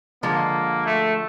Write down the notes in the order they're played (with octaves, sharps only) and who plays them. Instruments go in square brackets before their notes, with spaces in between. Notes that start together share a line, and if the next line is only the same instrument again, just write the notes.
[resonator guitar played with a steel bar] D3 F3 G#3 [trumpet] A#3
[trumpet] A3